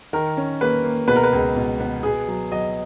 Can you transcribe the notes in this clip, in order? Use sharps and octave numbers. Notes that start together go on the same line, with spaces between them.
D#3 A#4
C#4
A#3 B4
A#3
B2 B4
A#4
B4
C#2
B2
B3
B2 G#4
F#3
F#3 D#5